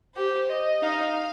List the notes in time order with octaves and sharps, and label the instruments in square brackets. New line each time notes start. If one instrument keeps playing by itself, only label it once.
[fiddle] G4 [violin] C5
[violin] D#5
[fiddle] D#4 [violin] F5